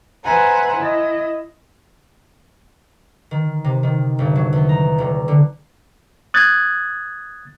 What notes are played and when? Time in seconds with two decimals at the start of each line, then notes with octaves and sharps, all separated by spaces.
0.24 B4 C5 E5 F#5 G#5 A#5
0.75 E4 D#5
3.31 D#3
3.64 C3
3.83 D#3
4.19 G1
4.36 F#3
4.53 E2
4.69 A#5
4.98 D#1
5.28 D3
6.34 D#6 F#6 G#6 A6